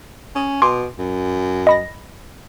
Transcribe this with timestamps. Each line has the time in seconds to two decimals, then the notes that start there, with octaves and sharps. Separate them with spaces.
0.35 C#4
0.62 B2 G#5 C6 D6
0.99 F#2
1.67 D#5 B5 A#6